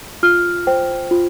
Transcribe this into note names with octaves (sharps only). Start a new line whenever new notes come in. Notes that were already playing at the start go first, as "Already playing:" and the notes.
F4 F6
C5 G5
F4